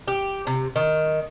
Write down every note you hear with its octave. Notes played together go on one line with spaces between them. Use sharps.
G4
C3
D#3